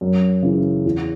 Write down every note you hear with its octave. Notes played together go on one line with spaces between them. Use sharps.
F#2
C#3 E3
E2